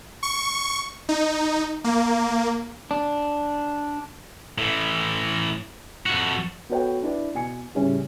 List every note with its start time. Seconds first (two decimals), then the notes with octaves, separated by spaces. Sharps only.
0.23 C#6
1.09 D#4
1.84 A#3
2.91 D4
4.58 A2 E3
6.06 F2 F#4
6.69 B3 F#4 A4 B4 C#5 G5
7.02 D4 E4 B4 D5
7.35 B2 G#5 C#7
7.75 A2 C#3 G3 C#4 E4 G#4